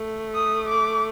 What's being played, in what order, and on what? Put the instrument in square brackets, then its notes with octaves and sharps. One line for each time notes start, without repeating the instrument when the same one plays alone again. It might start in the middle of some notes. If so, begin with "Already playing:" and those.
Already playing: [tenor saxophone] A3
[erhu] D#6
D6